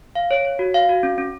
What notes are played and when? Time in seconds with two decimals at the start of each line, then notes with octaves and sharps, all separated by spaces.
0.15 F5
0.31 C#5
0.45 C#5
0.59 F#4
0.74 F5
0.89 F#4
1.03 C#4
1.18 C#4